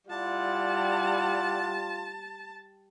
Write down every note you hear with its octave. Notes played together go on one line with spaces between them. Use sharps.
G3 E4 F4 D5 F#5 A5